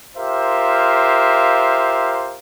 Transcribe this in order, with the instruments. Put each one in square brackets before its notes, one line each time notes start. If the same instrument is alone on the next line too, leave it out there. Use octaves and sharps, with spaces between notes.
[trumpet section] F4 G4 A#4 C5 E5 F5